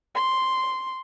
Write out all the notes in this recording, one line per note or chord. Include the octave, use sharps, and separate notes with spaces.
C6